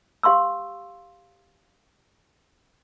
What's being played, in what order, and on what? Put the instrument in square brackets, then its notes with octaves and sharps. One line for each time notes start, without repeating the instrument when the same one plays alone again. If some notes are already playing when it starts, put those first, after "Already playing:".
[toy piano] G4 F5 C6 C#6 E6